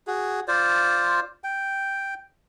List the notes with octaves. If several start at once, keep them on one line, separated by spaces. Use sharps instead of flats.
F#4 G#4
F4 C5 D5
G5